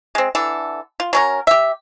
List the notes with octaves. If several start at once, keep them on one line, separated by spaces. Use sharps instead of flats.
G#3 C4
D3 E3 A4
F4
F#3 C#4 A#4
G4 E5